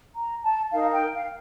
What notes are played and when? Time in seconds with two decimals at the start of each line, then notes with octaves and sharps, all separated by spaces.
0.16 A#5
0.43 A5
0.72 D#4 A#4 F5
0.92 G5
1.14 F5